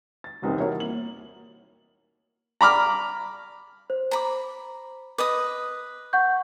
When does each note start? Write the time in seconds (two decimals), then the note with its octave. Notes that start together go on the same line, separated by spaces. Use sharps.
0.24 A6
0.42 E1 C2 C4 D#4 A#4
0.59 E4 F#4 A#4 C#5 E5
0.77 A#3 F#7
2.61 A#5 B5 D6 F6
3.90 C5
4.11 C5 A#5 B5 D6
5.18 B4 D#5 D6 D#6
6.13 F#5 C#6 G6